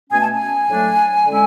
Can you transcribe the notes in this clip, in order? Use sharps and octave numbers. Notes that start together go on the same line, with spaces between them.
B2 A3 C#4 G#5
A5
G#5
A2 F#3 A3 D4
D3 G#3 C#4 E4